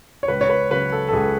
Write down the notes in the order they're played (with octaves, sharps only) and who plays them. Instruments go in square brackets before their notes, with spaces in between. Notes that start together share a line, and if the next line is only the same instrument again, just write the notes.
[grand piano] C#5
C#2 B4
C#5
B4
C#3 F#3 B4
A4
A4
C#2 G#4